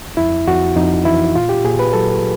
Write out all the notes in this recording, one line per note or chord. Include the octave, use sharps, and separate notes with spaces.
F2 E4
F2 F#4
F2 D#4
E3 E4
A#2 F4
G4
A#2 G#4
B4
F#3 A4